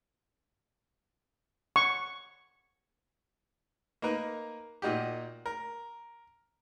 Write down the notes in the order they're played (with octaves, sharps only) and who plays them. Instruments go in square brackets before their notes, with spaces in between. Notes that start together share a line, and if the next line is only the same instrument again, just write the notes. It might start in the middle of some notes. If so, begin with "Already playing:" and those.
[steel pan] C#6
[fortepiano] A#3 D#4 A#4 B4
A#2 D#4 F#4 G4
A#4